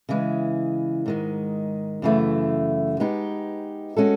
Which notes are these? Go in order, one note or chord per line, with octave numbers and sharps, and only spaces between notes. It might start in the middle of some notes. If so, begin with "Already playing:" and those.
C#3 E3 G#3
G#2 D#3 G#3
F#2 C#3 E3 A3
G#3 B3 D#4 G4
G#3 C#4 F#4 A4